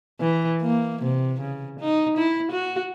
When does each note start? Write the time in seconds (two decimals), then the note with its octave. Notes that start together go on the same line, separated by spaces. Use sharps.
0.20 E3
0.62 A#3
1.02 C3
1.41 C#3
1.80 D#4
2.17 E4
2.52 F#4